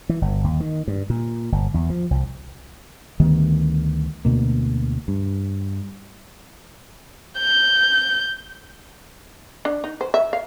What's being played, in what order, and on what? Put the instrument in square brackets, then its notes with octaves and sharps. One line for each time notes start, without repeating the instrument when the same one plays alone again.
[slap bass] E3
G1
D#2
D#3
G2
A#2
G1
E2
F3
C2
[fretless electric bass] D2 D#3 G3 B3
D2 B2 A#3
G2
[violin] G6
[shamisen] D4
D#4
C5
E5
F5